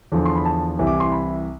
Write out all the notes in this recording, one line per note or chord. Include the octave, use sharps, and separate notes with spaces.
E2 D3 F3
C6
B5
A5
C2 C3 E3
D6
C6
B5